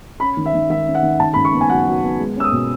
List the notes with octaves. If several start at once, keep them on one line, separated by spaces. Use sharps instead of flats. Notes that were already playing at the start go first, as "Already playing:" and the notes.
C#4 B5
D#3
E5
D#3
D#3 E5
C#4
F#5
D#3
C#3 A5
C#3 B5
C#6
B3
G#5
F#3 F#5
F#3
B3
G#3
C#4 E6
D#6
B2